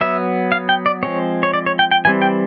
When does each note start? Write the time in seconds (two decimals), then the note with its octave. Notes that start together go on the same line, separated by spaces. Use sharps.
0.01 F#3 B3 E5
0.52 F5
0.69 G5
0.86 D5
1.03 F3 G#3 C4 C#5
1.43 C#5
1.54 D5
1.66 C#5
1.79 G5
1.91 G5
2.05 E3 G3 C4 G#5
2.22 G5